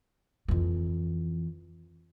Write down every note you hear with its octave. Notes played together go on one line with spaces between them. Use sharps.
F2 E3